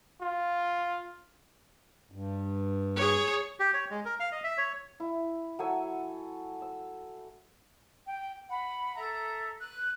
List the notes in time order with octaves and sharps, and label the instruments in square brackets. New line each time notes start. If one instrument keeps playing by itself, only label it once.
[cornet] F4
[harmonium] G2
[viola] G#4 C#5
[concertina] G4
C#5
G#3
A#4
F5
D#5
E5
C#5
[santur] E4
F#3 A4 G#5 E6
E6
[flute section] G5
F#5 B5
A4 E5 A#5
F#6